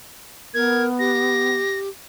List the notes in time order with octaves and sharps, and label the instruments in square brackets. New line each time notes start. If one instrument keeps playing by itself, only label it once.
[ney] B3 [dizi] A#4 [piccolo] G#6
[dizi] G4 [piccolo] A#6